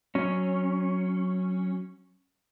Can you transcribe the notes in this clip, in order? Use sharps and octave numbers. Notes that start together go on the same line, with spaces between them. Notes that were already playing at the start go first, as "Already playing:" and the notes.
F#3 C#4